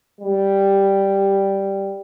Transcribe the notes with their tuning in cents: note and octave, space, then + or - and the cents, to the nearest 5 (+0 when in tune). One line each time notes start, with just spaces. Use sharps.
G3 +0